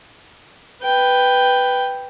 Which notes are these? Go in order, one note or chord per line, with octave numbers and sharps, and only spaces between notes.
B4 G5